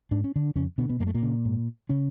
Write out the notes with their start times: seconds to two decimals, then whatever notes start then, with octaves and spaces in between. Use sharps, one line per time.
0.11 G#2 D4
0.24 C#4
0.36 D3 D4
0.56 F2 C#3 C#4
0.78 B2 D3 B3
0.89 B2 B3
1.00 F#2 A#3
1.07 A3
1.14 A#2 A#3
1.23 C#3
1.45 G#2
1.89 C#3 C#4